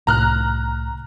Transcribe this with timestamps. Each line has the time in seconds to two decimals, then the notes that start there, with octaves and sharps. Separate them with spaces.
0.07 C2 A2 A#5 F6 F#6